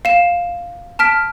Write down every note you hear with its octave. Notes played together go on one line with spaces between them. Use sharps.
F5 E7
A5 F6 B6 D7